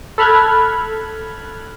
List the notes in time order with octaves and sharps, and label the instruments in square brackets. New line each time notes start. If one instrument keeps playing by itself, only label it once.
[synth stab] A4 B5 F6 F#6 G#6